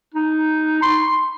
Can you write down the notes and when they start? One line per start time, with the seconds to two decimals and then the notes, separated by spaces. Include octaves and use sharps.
0.15 D#4
0.82 C6